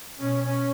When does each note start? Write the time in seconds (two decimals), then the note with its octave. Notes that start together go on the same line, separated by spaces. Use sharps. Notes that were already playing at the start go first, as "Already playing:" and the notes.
0.19 B2 C#4
0.44 C#4